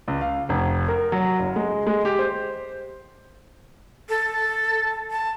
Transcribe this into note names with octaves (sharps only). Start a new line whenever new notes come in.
C#2
F5
F1
A#4
F#3
F#1
G#3
G#3
G4
C5
A4
A5